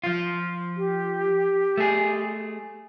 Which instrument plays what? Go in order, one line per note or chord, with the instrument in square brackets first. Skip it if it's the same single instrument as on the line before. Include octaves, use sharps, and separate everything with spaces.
[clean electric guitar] F3 F4
[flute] G4
[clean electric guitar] A3 G#4